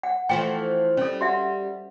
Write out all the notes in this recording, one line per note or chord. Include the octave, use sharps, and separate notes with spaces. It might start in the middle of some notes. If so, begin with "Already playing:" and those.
F#5
E3 F3 A3 G5
G3 C#4 A4
F#4 E5 F#5